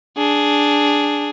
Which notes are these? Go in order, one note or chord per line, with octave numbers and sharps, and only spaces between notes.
D4 G#4